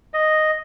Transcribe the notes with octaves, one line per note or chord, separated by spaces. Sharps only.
D#5